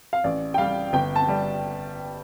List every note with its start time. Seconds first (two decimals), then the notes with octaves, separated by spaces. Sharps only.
0.13 F5
0.24 A1 D5
0.54 G5
0.58 G3 F5
0.93 G1 G5
1.16 A5
1.28 G3